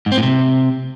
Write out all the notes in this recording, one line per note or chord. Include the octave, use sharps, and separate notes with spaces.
G#2
C4
A2
C3